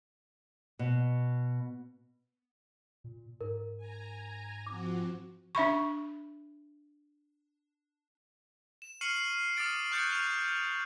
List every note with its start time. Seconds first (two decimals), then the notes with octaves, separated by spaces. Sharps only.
0.79 B2
3.04 A#2
3.41 G#2 A#4
3.77 G#5 A#5
4.66 F3 C4 F#4 D6
5.55 D4 E5 B5 C#6
8.82 E7
9.01 C#6 F6 C7 C#7 D#7 F#7
9.16 C7
9.57 D6 D#6 F6 A6 D7
9.92 C#6 F#6 G6 A6 C#7
10.10 F6 G6 F7